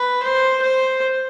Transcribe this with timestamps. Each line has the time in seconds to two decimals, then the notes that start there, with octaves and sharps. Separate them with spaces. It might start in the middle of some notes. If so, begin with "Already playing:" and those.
Already playing: B4
0.23 C5
0.62 C5